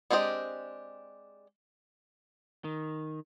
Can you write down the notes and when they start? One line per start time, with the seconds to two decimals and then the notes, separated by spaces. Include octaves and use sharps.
0.11 G#3 C4 D4 G4 D#5
2.64 D#3